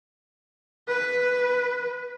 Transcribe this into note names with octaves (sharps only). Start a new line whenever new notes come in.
B4